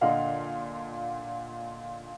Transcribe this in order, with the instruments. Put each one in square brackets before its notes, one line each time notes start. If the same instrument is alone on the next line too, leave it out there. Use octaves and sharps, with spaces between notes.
[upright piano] A#2 D3 D#5 F5 F#5